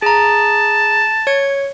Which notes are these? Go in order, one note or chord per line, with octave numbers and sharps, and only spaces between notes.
G#4 A5 A#5
C#5 G#6 C#7